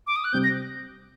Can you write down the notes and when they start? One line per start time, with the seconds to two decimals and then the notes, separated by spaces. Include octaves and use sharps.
0.07 D6
0.16 D#6
0.24 F#6
0.33 C3 G3 C4 G6
0.44 A#6